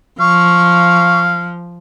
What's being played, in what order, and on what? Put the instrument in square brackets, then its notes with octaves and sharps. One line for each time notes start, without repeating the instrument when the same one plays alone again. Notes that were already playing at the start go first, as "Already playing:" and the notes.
[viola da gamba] F3 [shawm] F5 [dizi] C#6